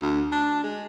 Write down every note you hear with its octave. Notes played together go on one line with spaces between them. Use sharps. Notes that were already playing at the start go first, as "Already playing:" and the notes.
D2
D4
G#3